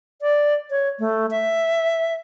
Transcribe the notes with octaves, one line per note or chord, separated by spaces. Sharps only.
D5
C#5
A3
E5